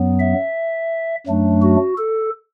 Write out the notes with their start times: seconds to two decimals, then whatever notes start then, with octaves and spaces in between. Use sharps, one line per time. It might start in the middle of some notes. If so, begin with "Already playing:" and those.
Already playing: F#2 F#3 B3
0.20 E5
1.27 F#2 F#3 A3 D4
1.62 F#4
1.98 A4